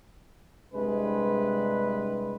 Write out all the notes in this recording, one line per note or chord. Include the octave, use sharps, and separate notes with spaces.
C2 G2 C3 G#3 B4